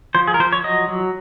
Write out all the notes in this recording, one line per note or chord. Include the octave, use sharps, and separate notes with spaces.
F3 C5
G#4
A#4
F3 C5
C#5
F#3 D#5
F#3